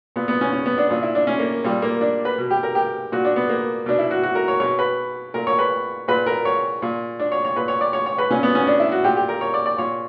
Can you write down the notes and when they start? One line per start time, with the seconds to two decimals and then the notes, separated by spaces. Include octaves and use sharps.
0.16 A#2 B3
0.28 B3
0.41 C#4
0.53 C#4
0.66 B3
0.78 D4
0.90 A#2 D4
1.02 E4
1.15 D4
1.27 C#4
1.39 A#3
1.64 A#2 G3
1.82 A#3
2.01 D4
2.25 B4
2.38 B2
2.51 G4
2.63 A#4
2.75 G4
3.12 A#2 F#4
3.25 D4
3.36 B3
3.49 A#3
3.86 B2 D4
3.99 E4
4.11 F#4
4.23 F#4
4.35 A#4
4.48 C#5
4.60 B2 C#5
4.79 B4
5.34 A#2 A#4
5.47 C#5
5.59 B4
6.08 A#2 B4
6.26 A#4
6.45 C#5
6.82 A#2
7.19 D4
7.32 C#5
7.44 C#5
7.56 A#2 B4
7.68 C#5
7.81 D5
7.93 C#5
8.06 C#5
8.18 B4
8.30 A#2 C#4
8.43 B3
8.55 C#4
8.67 D4
8.80 E4
8.92 F#4
9.04 A#2 G4
9.17 G4
9.29 A#4
9.41 C#5
9.54 D5
9.66 D5
9.78 A#2 C#5